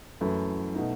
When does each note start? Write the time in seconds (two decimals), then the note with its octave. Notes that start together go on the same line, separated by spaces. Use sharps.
0.21 F#2 E3 A3 E4
0.75 B2 A3 D#4